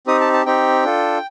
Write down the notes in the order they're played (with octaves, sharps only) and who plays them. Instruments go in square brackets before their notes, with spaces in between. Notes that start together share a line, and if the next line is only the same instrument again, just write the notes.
[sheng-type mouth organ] C4 D#4 G4 D#6
A5
A5
C4 D#4 G4 G5
D4 F4 A4